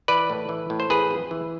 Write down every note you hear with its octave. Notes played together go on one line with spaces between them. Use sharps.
E3 B4 D5
A2
E3
A2
C5
E3 G#4 B4
F2
E3